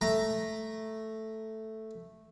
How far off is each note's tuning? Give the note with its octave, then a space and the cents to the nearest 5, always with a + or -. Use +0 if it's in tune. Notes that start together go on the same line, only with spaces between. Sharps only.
A3 +0 A#5 +0